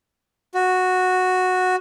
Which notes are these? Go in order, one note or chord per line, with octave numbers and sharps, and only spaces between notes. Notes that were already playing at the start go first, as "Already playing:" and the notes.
F#4